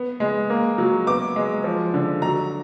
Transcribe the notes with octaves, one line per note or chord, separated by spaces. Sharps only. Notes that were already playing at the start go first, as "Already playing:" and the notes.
Already playing: B3
G#3
A#3
F#3
B3 D6
G#3
F3
D3
F#3 A#5